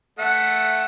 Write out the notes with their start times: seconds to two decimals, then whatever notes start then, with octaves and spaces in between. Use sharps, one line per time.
0.19 A3 E5 F#5